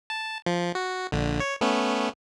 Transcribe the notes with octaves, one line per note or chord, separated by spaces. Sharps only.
A5
F3
F#4
A#1 D3
C#5
A3 B3 C#4